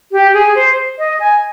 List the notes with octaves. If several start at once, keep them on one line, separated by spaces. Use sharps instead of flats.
G4
G#4
C5
D#5
G#5